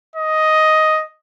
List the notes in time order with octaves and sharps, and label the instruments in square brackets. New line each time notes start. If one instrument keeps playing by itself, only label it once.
[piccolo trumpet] D#5